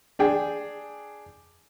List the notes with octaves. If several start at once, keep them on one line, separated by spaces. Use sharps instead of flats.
D4 G#4 G5